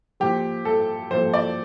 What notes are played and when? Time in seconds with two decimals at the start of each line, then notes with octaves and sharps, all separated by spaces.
0.20 A#2 F3 G4
0.65 A4
1.11 A#2 F3 C5
1.34 D5